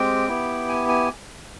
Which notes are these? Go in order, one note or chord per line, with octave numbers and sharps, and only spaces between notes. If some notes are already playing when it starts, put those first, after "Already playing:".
Already playing: G#3 C4 G4 G5
B3 E4 G4
G#5
G#5